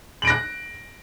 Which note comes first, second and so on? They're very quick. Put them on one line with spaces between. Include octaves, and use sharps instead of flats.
F#7 D7 A#6 F#6